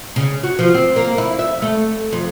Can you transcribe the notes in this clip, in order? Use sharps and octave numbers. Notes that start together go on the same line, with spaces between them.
C#3
F#4
F3
C4
A#3
E4
E5
A3
F2